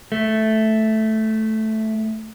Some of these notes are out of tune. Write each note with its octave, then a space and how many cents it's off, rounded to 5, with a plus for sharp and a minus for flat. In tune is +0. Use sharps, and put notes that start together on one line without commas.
A3 -5